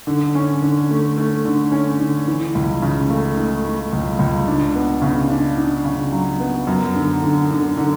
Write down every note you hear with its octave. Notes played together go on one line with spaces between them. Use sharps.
D3
C#4
D3
A3
A3
D3
C#4
D3
E3
C#2
C#3
A3
A3
A3
C#2
C#2
D4
B3
C#3
D4
D4
C#3
F#3
B3
F#2
D3
D3
D3
D3